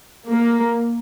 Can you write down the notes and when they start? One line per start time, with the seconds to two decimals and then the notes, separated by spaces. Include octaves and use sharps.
0.31 A#3